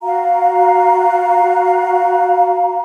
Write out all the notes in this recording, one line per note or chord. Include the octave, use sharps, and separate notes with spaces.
F#4 F5 A#5